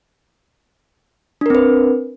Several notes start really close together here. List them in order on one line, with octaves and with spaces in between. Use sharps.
D4 A#4 C4 B4